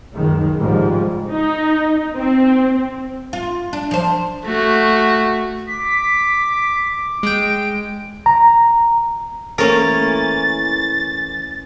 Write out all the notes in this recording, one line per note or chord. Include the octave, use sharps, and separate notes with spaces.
C#2 F#2 D#3 G#3
G#2 C#3 F3 G3 G#3
D#4
C4
F4
D4
F3 C5
A3 F#4
D6 B6
G#3 G5 D7
A#5
E3 A3 A#3 C#4 A#4 A6